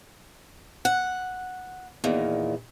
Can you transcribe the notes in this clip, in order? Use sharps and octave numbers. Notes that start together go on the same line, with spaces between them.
F#5
E2 A#2 D#3